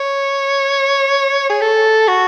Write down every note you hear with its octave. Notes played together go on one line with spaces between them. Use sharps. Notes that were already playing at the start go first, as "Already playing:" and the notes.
Already playing: C#5
G#4
A4
F#4